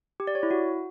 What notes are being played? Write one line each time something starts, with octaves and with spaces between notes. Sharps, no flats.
G4
D5
C#5
E4
F#4